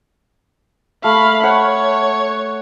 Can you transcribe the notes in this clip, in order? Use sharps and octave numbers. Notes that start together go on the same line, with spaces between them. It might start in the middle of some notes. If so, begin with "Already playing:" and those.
A3 F5 B5
C#5 F#5